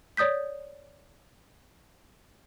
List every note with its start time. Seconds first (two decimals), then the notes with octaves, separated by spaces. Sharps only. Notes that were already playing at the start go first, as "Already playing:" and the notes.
0.17 C#5 D5 D#6 G6 B6